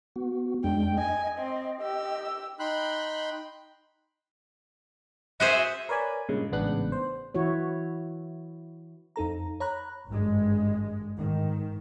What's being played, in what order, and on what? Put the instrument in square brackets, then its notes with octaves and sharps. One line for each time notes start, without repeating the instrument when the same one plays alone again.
[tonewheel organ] B3 F#4
[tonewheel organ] F2 G#3 D4 [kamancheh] G5
[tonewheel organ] D#5 [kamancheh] G#5
[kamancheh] C4
G4 E6
[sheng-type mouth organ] D#4 G5 B5 C6 F#6
[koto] F#4 G#4 C5 [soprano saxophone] E5
[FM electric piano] A#4 B4 C#5 D5 G#5 B5
G2 A#2 C#3 G#3
A1 G#2 C#3 B3 D4 F#6
C5
[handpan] E3 E4 F#4 C#5
[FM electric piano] F2 D#4 A4 A#5
C#5 A#5 B5 F#6
[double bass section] G#1 G2 G#3
G#2 D#3